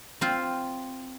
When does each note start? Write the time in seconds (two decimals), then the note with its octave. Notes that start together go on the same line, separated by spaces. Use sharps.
0.21 C4 F4